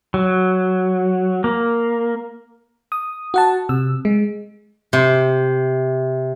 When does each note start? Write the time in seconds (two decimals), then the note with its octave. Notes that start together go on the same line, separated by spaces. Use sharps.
0.14 F#3
1.44 A#3
2.92 D#6
3.34 F#4 F#5 A5
3.69 C3 E6
4.05 G#3
4.93 C3